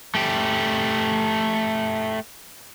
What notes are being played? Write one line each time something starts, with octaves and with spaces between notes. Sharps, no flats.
A3 G4